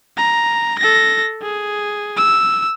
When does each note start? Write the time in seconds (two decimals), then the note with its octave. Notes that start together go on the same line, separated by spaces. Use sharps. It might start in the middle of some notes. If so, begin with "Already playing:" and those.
0.17 A#5
0.79 A4 A#6
1.42 G#4
2.17 E6